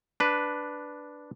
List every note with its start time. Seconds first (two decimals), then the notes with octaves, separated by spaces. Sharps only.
0.20 D4 B4